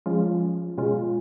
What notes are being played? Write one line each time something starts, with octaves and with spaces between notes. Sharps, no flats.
F3 G#3 C#4 F4
B2 G#3 C#4 F4